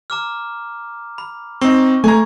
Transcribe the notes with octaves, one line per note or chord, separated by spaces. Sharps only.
A#5 D6 F6
B5
C4 D#4 C#6
A3 G#5 A#5 C#6 G#6